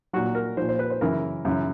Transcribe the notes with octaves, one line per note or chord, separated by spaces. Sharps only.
A#2 F#3 F#4
A#4
A#2 F3 C5
C5
B4
C5
F#2 C#3 E3 A#4
F#2 C#3 E3